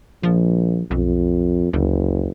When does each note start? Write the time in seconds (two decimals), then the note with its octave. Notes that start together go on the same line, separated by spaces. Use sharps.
0.23 A#1 F3
0.91 B1 F2
1.73 F#1 D2